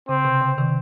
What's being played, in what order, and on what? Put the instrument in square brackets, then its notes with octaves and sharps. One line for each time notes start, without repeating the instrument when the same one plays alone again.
[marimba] C#3 [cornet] C4
[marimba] C3
C#3
C3 D#3